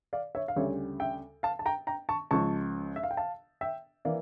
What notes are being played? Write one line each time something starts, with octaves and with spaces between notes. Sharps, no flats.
D5 F5
C#5 E5
F5
D2 C#3 G3 C#5 E5
E5 G5
F5 A5
A5
G5 A#5
G5 A#5
A5 C#6
C#2 C#3 F3 A5 C#6
E5
F5
G5
F5 A5
E5 G5
E3 A#3 D5 F5